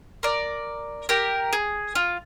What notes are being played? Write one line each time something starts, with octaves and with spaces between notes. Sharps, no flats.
A#4 D5
G4 A#4
G#4
F4